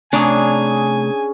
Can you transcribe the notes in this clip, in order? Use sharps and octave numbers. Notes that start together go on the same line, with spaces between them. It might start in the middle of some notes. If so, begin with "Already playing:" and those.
C3 A3 C#4 D4 G#4 G#5 A#5